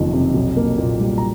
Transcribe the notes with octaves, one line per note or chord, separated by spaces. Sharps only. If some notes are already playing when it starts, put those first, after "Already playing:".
Already playing: F#1 F2 D#3
C3
B1
A#3
A#2
G3
A#5